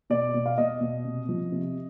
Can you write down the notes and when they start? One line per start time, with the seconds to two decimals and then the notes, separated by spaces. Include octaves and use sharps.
0.10 B2 D5
0.34 B2
0.46 F5
0.58 B2 D#5
0.81 B2
1.05 C3
1.29 F3
1.52 C3